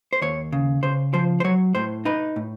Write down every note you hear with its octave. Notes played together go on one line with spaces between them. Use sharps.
C5
D#2 C#5
C#3
C#3 C5
F3 C5
C5
F#3 C#5
A2 C5
D#4 B4
A2